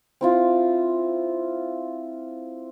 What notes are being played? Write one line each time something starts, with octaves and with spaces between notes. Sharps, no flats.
C4 E4 F4